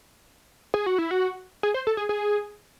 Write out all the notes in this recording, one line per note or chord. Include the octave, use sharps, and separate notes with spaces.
G#4
F#4
E4
F#4
G#4
C5
A4
G#4
G#4